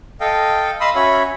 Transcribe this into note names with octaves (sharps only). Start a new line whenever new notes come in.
A4 D#5 F5 G5
D#5 F5 B5 C6 D#6 E6
C#4 F#4 C#5 E5 B5